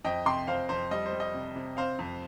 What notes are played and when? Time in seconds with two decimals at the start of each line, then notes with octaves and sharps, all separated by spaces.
0.04 F2 D#5 G5
0.25 C3 G5 C6
0.47 F2 C5 F5
0.69 F2 C5
0.91 G3 D#5
1.06 C5
1.13 G3
1.20 D#5
1.34 C3
1.56 C3
1.77 C4 C5 F5
1.99 F2